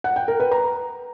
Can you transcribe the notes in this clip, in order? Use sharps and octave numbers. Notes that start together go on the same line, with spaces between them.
F#5
G5
A#4
B4
A#5